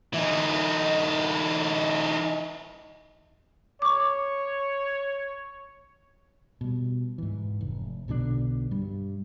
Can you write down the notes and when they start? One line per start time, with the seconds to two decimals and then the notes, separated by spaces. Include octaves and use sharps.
0.14 E3 D#4
3.82 C#5 C#6 D6
6.61 B2 G3
7.18 G#2 E3
7.61 F1
8.08 B1 B2 D3 D4
8.71 G2 G3